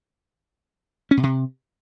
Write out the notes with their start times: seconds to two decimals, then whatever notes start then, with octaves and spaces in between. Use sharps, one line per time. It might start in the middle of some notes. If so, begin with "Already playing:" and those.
1.11 C#4
1.17 B2
1.23 C3